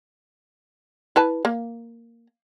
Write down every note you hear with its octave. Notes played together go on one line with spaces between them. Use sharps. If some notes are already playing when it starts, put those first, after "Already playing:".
E4 B4 A5
A#3